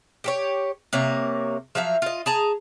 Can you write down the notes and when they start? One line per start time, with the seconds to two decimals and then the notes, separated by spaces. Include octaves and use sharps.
0.24 G4 A4 C#5
0.93 C3 A#3 C#5
1.75 F3 F#3 E5 F5
2.02 F4 D#5
2.26 G#4 A5 A#5